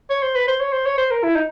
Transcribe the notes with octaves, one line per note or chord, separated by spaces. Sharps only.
C#5
C5
B4
C5
C#5
C5
C#5
C5
A#4
E4
D#4